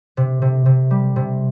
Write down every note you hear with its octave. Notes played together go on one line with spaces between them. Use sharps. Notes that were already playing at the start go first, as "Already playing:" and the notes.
C3
C3
C3
G3
C3